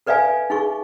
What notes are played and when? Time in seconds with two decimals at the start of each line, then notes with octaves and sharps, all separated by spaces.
0.07 A4 B4 D5 E5 F5 G#5
0.50 D#4 G#4 C#6